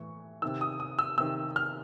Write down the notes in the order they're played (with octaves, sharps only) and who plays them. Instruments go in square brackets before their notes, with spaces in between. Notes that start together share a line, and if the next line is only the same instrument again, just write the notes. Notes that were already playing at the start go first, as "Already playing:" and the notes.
Already playing: [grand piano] A2 E3 C#6
C3 D#3 E6
D#6
D#6
E6
C3 D#3 E6
F6